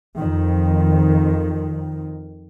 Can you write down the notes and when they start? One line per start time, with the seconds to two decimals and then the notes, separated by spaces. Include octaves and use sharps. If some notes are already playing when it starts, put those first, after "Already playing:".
0.18 F2 D#3